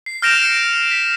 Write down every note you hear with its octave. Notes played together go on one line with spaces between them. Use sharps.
C7
F6 G6 A#6 D7 E7 F7
C#7
B6